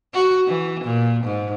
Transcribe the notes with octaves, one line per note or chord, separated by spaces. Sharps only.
F#4
E3
A#2
G#2